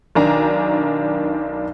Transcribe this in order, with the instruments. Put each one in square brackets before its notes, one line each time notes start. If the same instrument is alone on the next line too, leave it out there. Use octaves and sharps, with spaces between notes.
[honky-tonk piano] B1 D#3 D4 G#5 A#5